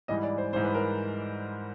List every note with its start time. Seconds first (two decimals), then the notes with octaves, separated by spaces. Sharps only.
0.08 G#2 E3 G3 D#5
0.23 D5
0.38 C5
0.53 G#2 E3 G3 C5
0.64 B4
0.74 A#4